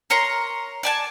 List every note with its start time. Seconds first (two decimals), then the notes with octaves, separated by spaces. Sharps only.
0.10 A#4 C#5 A#5 C6
0.83 D5 G#5 A5